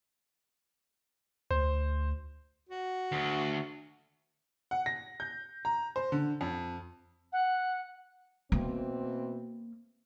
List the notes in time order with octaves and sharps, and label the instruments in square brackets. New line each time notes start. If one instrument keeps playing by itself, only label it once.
[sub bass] D2 [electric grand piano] C5
[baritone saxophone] F#4
[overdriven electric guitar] D2
[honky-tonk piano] F#5
A#6
G6
A#5
C5
D3
F2
[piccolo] F#5
[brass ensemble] B2 E3 C4 [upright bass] A#3